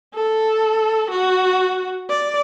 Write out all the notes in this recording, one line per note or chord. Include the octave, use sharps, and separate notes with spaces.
A4
F#4
D5